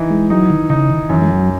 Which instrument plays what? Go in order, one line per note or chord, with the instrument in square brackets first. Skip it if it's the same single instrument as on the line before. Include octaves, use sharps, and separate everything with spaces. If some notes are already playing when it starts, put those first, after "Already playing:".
Already playing: [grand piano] E3 D#4
[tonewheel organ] G#3
[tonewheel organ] F#3 [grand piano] D#4
[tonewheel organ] D#3
[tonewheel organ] C#3 [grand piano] D#4
[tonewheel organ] D#3
[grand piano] F#2 [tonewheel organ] E3
[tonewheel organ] G#3
F#3